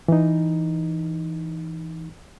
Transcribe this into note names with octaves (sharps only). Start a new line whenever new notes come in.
E3 D#4